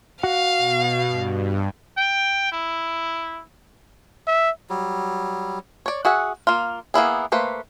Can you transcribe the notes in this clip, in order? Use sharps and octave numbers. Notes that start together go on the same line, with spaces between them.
F#4 F5 F#5
B2
G2
G5
E4
E5
F#3 G3
C#5 D5
F#4 G#4 E5 F#5
A#3 F4
A#3 B3 E4 G#4
A3 A#3 B4 C5